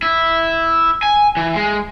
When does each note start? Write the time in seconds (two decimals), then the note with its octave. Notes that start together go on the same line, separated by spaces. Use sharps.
0.02 E4
1.03 G#5
1.37 E3
1.56 G#3